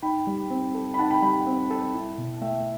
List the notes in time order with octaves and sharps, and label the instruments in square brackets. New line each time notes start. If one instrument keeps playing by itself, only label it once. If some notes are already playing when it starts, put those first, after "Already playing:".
[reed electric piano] D#4 [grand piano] G5 B5
[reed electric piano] G3
C4
A4
[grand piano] B5
[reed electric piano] D#4 [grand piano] F#5 A5
[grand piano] G5 B5
[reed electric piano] G3 [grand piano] G5 B5
[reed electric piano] C4
A4
E4
B2
[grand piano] A5
[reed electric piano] A3 [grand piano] E5 G5